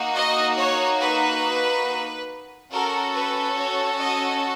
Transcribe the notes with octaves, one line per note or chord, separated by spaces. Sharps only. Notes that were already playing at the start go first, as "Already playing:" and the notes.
Already playing: A#3 D#4 F#4
D#5
C#5
B4
C#4 F#4 A4 A#4
B4
C#5
D#5